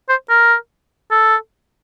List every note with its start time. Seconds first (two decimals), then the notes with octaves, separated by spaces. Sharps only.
0.09 C5
0.30 A#4
1.11 A4